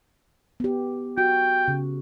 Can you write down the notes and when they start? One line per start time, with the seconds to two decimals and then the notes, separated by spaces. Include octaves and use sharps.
0.60 B3 G4
1.18 F#4 G5
1.68 C#3